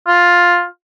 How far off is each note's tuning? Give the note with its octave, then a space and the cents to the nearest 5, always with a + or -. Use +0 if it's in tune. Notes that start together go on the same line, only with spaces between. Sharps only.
F4 +10